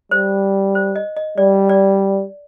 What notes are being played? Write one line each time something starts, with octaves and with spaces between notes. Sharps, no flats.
G3 C5
C5
D#5
D#5
G3 D5
D5